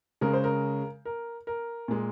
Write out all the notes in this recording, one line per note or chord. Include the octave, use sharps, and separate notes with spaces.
C#3 G#3 A#4
C5
A#4
A#4
A#4
A#2 G#3